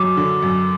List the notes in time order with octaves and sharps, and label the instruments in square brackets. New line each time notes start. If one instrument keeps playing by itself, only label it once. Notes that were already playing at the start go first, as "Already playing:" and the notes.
Already playing: [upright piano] F#2 F#3 [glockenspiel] D6
[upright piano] D3
F#2